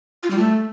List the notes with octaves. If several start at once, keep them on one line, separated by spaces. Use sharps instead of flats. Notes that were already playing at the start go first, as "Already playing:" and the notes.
F4
G3
A3